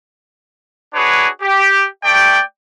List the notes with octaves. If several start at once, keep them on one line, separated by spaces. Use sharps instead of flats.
D4 F#4 G#4 B4 C#5
G4
A3 D5 G5